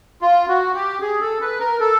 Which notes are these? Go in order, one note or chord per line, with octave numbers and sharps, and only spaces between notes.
F4
F#4
G4
G#4
A4
B4
A#4
A4